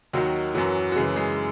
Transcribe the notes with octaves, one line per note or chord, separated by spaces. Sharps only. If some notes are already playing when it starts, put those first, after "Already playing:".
D#2 D#3 F#3 F#4
F#2 E3 F#3 F#4
F#4
F#2 C#3 E3 G#3 G#4
G#3 G#4